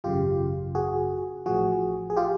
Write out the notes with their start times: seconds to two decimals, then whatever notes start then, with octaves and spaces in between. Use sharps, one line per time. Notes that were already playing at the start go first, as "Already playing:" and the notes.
0.04 G#1 F#2 C#3 F4 G4
0.75 F#4 G#4
1.46 A1 A2 F3 F#4 G#4
2.10 G#4
2.17 F4 G4